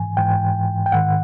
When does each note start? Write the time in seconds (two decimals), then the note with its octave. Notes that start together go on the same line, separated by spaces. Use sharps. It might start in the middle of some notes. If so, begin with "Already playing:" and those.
Already playing: G#2 E3 G#5
0.17 G#2 E3 G5
0.86 G5
0.92 G#2 D#3 F#5